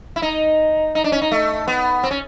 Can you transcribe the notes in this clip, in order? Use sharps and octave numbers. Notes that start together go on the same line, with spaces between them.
E4
D#4
D#4
D4
C#4
D#4
A3
B3
C4
C#4